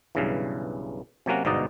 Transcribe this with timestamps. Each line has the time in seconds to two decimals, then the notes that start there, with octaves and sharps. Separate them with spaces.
0.15 B1 G2 C#3 E3
1.26 C3 F#3 A#3 C#4 F#4
1.45 G1 G#2 B2 D#4 D5 D#5